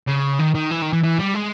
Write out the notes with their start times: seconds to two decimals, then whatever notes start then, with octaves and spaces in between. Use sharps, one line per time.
0.07 C#3
0.39 D#3
0.55 D#3
0.71 E3
0.82 D#3
0.93 E3
1.03 E3
1.19 G3
1.34 G#3